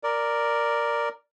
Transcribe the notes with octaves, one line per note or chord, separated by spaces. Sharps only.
A#4 D5